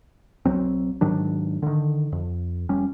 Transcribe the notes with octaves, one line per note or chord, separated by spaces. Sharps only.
B1 G2 F#3 C4
G#2 D#3 F#3 D4
D3 D#3
F2
F1 G3 C#4